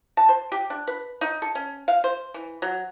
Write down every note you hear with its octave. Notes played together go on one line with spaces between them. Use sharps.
A5
C5
G4
D4
B4
D#4
A4
C#4
F5
C5
E3
F#3